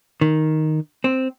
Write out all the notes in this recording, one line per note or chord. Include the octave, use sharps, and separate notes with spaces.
D#3
C4